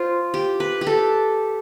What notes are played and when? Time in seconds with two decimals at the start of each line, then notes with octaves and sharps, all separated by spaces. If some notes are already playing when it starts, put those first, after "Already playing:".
Already playing: F4 C5
0.34 G4
0.60 B4
0.81 G4
0.87 A4